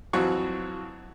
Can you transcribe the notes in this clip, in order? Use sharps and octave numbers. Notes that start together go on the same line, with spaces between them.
F2 E3 F#3 C4 F#4 C#6